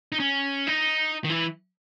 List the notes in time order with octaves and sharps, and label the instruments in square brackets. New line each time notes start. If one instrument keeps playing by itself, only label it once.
[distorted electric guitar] D#4
C#4
D#4
D#3
E3